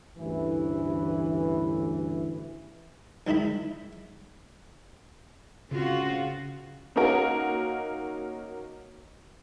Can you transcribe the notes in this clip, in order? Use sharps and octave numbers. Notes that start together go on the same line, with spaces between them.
A1 D2 G2 E3
C#2 D#3 D#4 E4 B5
C#3 C4 F4 F#4
A#3 C#4 D#4 F#4 A#4